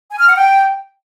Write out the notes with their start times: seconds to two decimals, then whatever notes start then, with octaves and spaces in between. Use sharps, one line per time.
0.11 G#5
0.20 F6
0.28 F#5
0.37 G5